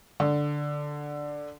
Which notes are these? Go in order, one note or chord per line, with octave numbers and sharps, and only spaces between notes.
D3